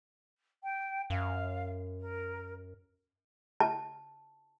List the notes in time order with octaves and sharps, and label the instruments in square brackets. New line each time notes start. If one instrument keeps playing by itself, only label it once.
[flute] G5
[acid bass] F#2 [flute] F5
[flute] A#4
[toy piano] A5